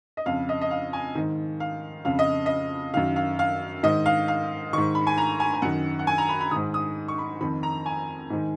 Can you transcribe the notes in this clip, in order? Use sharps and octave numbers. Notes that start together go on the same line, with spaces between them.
D#5
F2 C#3 F5
D#5
D#5
F5
G#5
G#2 D#3
F5
F2 C#3 F5
D#5
D#5
F#2 D#3 F5
F5
F5
G#2 D#3 D#5
F5
F5
G#2 D#3 C#6
B5
G#5
A#5
G#5
G#5
F#2 D#3 F#5
F#5
G#5
A#5
B5
B5
G#2 D#3 D#6
D#6
C#6
B5
F2 D#3 B5
A#5
G#5
G#2 D#3